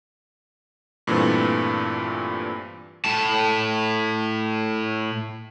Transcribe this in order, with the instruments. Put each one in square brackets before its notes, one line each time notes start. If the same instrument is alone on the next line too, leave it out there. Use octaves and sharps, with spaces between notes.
[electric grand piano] G2 A#2 E3 A3 C4
[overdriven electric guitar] A2 A5